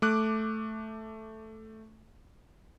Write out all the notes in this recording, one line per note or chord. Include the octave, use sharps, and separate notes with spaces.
A3 D6 F#6